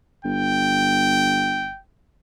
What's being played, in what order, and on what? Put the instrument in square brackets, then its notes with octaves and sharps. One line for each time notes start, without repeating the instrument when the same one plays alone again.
[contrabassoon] G1 [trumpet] G5